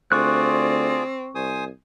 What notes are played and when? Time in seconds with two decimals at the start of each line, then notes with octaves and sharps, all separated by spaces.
0.12 D2 C4 F4 G#4 D5 C#6 F#6
1.35 C2 C5 G#5 D#6